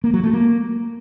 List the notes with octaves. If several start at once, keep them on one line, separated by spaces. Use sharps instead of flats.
A#3
F#3
A3
A#3